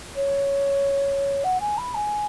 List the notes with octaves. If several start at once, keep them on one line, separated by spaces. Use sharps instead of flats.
C#5
F#5
G#5
B5
G#5